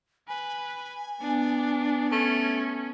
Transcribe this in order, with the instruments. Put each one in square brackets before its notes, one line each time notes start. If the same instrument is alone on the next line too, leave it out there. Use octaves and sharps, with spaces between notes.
[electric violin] B4 [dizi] G#5
[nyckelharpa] B3 [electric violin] D4
[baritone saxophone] A3 [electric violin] C#4